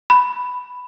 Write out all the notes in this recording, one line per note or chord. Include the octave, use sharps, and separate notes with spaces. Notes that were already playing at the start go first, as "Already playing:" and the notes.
B5